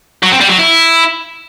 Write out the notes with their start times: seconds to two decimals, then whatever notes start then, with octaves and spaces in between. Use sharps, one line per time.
0.23 F#3
0.32 C4
0.41 G3
0.50 F#3
0.59 E4